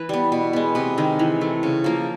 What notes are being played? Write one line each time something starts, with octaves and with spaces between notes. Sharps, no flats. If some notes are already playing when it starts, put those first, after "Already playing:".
Already playing: E3 B4
G3 B3
B2
G#3 B3
C3 B4
D#3 G#3
E3
A3
C#3
F3 A#3